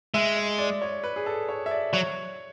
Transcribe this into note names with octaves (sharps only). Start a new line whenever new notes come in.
G#3 E5
E5
D5
C#5
B4
G#4
A4
C#5
E5
D5
F#3 C#5